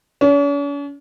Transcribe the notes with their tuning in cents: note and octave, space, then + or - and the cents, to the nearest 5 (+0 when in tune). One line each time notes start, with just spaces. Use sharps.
C#4 +45